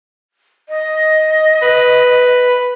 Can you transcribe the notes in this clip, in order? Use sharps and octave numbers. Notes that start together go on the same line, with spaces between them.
D#5
B4